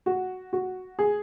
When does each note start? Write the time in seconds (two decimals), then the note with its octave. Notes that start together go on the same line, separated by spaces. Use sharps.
0.06 F#4
0.53 F#4
0.99 G#4